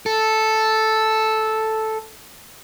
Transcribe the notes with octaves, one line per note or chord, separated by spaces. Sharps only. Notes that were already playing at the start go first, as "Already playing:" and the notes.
A4